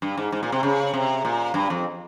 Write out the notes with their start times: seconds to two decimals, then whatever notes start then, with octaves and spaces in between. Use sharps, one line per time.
0.02 G2
0.17 G#2
0.32 G#2
0.43 A#2
0.52 C3
0.63 C#3
0.94 C3
1.25 A#2
1.54 G2
1.70 F2